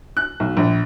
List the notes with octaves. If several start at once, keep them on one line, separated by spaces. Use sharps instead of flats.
F#6
B1
A#1